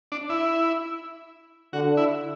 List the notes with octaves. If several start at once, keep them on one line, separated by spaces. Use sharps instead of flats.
D4
E4
D3 F#4
E4